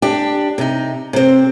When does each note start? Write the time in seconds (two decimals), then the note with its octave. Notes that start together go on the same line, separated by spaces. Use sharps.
0.02 D4 G4
0.58 C3 D#4
1.13 C3 C4